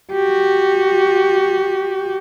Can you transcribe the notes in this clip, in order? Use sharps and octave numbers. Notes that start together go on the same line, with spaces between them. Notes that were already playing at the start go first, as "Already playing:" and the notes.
F#4 G4